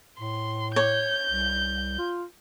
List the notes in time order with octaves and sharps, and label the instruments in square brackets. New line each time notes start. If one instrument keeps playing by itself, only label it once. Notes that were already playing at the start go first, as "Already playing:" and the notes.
[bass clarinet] A2 [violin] C6
[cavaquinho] C#5 [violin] G6
[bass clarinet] C2
F4